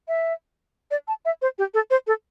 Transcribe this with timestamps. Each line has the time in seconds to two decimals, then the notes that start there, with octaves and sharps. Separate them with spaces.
0.08 E5
0.91 D5
1.08 A5
1.25 E5
1.42 C5
1.58 G4
1.74 A4
1.91 C5
2.07 A4